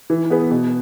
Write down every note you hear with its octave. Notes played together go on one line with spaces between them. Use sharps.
E3
B3 G#4 B4
B2